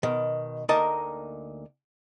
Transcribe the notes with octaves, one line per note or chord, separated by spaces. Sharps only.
B2 D#3
D2 A#3 D#4 A#4 D#5 A5